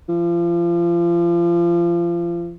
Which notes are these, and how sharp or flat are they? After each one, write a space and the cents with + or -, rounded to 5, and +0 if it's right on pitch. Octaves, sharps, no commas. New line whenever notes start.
F3 -30